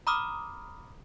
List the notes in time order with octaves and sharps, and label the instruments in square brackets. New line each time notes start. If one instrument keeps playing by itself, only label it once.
[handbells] A#5 B5 D6 D#6 F6